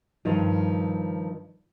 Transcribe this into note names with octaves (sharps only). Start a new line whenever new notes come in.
G2 D#3 F3